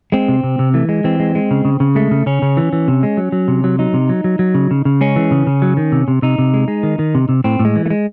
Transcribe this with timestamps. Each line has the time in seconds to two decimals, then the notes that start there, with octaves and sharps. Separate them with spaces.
0.12 G#3 C4
0.28 C3
0.44 C3
0.59 C3
0.74 E3 A3
0.89 G#3
1.04 E3 C4
1.20 G#3
1.35 G#3
1.51 C#3
1.65 C#3
1.80 C#3
1.95 G#3 A3
2.11 C#3
2.26 C#3 C#4
2.42 C#3
2.57 E3
2.73 E3
2.88 C3
3.03 G#3
3.17 F#3
3.32 F#3
3.48 C3
3.64 F#3
3.79 F#3 D#4
3.94 C3
4.09 F#3
4.24 F#3
4.39 F#3
4.55 C#3
4.71 C#3
4.85 C#3
5.01 G#3 C#4
5.16 E3
5.31 C#3
5.47 C#3
5.62 F#3
5.77 D#3
5.92 C3
6.08 C3
6.22 C3 D#4
6.38 C3
6.54 G#3
6.68 G#3
6.83 D#3
6.99 D#3
7.15 C3
7.29 C3
7.44 A2 C4
7.59 A2
7.65 G#3
7.76 E3
7.86 A3
7.90 G#3